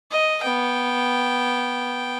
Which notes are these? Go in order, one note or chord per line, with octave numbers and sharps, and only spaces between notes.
D#5
B3 G5